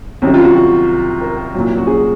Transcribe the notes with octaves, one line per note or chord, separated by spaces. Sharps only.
C2 C3 D#3 F#3 C#4
F4
F#4
F#4
A#4
C2 A#2 F#3
F#4
G#4